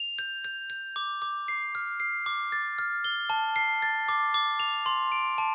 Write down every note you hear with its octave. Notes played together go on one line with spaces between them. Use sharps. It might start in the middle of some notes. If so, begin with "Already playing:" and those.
Already playing: F7
G6
G6
G6
D6
D6
C7
F6
C7
D6
A6
F6
G7
A5
C7
A6
D6
D6
F7
C6
D7
A5